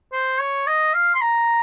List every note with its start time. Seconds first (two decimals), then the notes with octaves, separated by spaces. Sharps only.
0.12 C5
0.40 C#5
0.67 D#5
0.94 F5
1.15 C6
1.21 A#5